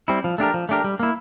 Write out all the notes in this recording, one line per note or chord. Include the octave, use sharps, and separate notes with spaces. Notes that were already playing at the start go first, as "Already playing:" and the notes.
G3 C4 E4
F3
A3 D4 G4 A#4
F3
A3 D4 G4 A#4
G3
A#3 E4